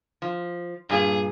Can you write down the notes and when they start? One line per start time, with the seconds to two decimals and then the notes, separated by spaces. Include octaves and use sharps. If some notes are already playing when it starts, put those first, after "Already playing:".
0.22 F3
0.90 G2 A#2 G#4